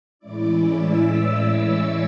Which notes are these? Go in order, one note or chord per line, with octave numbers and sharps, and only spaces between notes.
A2 E3 G#3 C#4 E4 D5 D6
D5 D6
E5 E6
D5 D6
D5 D6
C#5 C#6